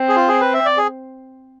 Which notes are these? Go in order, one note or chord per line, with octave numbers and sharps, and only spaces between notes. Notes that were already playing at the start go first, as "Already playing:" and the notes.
Already playing: C4
G#4
F4
G#4
B4
E5
D5
G#4